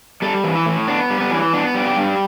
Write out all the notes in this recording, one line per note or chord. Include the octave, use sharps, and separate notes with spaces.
G3 A4
E3
E4
A2
B3 D4
G3
B3
E3
B3 D4
G3
G4
G2